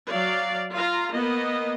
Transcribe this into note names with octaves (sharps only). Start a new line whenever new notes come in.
F#3 D5 F5
F4 F5 A#5
A#3 B3 D#5